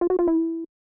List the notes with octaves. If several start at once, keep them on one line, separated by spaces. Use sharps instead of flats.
F4
F#4
F4
E4